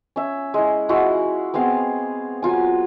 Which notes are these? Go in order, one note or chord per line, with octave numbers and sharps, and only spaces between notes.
C#4 E5
G#3 E4
G#3 E4 F#4 F5
B3 C4 G#4 F5
F#3 F4 G#5